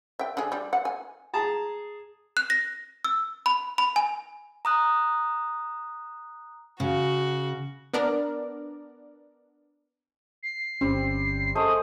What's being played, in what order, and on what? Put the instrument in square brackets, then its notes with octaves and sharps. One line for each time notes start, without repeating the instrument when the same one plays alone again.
[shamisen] E5 G5
D3 G#4
G3
F#5
G#5
[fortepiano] G#4 A5 A#5
[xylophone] F#6
A#6
E6
B5
B5
G#5
[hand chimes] A#5 D#6 F#6
[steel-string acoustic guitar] C#3 [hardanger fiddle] F#4
[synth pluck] B3 D4 A#4 D5
[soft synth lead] C7
[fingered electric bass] G1 C#4 [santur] G3 C4
[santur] G#3 A3 C5 [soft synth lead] D#6